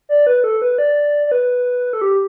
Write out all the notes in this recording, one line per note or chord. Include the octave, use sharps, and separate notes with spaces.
D5
B4
A4
B4
D5
D5
B4
A4
G4